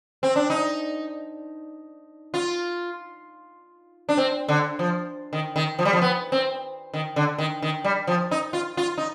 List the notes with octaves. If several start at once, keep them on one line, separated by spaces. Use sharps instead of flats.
C4
D4
D#4
F4
D4
C4
D3
F3
D#3
D#3
F3
G3
F3
B3
C4
D#3
D3
D#3
D#3
G3
F3
D#4
F4
F4
D#4